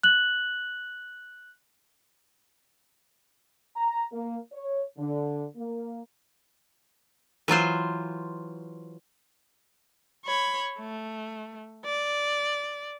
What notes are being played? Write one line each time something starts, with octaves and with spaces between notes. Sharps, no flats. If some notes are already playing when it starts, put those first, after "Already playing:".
F#6 F#7
A#5
A#3
C#5
D3
A#3
E3 F#3 F4 C5
C#5 B5
A3
D5